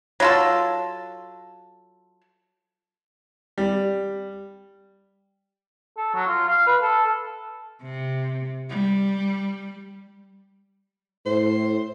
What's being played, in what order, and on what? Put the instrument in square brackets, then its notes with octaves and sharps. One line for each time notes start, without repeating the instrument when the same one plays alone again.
[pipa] F#3 F4 A4
[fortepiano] G3
[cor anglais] A4
F#3
F4
F5
B4
A4
[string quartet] C3
G3
[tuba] A2 [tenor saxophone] C5